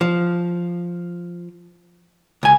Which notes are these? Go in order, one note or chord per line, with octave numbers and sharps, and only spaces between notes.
F3
C#2 G#5